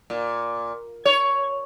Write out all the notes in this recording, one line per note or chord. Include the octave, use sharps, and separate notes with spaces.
A#2
C#5